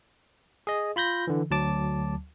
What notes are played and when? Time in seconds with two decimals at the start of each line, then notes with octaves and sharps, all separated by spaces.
0.67 G#4 D#5
0.96 F4 B5 G6 A#6
1.27 D3 E3
1.51 D2 F#3 A5 D6